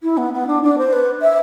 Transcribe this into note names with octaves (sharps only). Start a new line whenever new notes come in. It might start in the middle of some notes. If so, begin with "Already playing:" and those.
E4
B3
B3
D4
D4
C5
B4
E5